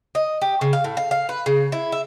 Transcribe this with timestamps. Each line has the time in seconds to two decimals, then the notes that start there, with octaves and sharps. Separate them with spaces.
0.15 D#5
0.42 G4
0.61 C#3
0.73 F5
0.84 A2
0.97 F5
1.11 F5
1.29 B4
1.46 C#3
1.72 E4
1.92 E5